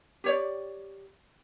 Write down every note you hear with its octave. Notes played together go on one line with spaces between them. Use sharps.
G4 C#5 D5